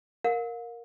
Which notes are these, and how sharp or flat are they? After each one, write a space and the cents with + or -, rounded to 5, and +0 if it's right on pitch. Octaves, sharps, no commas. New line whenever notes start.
A#4 +0 F5 +35